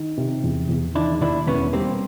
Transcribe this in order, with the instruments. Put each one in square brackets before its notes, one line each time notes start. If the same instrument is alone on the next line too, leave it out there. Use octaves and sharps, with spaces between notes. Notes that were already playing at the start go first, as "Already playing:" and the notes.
Already playing: [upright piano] D#3
C3
E2
E2
[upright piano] D#3 [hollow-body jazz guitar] D4 E4
[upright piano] D#2 [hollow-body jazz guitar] D4 E4
[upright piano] E1 [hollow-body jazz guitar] B3 C#4
[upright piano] G3 [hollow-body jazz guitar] A#3 C4